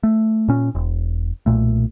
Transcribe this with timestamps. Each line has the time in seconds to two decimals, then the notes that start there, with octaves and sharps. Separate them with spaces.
0.03 A3
0.48 A#2 C#4
0.75 E1
1.46 B1 A#2 A3